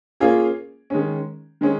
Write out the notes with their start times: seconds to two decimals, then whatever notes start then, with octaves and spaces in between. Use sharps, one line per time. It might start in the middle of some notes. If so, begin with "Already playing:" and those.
0.20 A#3 C#4 F4 G#4
0.90 D#3 G#3 C#4
1.61 D#3 G#3 C#4